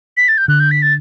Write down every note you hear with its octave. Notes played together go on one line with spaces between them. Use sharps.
B6
A6
G6
D3 F#6
G6
B6
A6